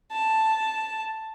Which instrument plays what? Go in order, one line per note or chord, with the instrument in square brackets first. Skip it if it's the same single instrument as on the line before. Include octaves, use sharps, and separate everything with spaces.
[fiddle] A5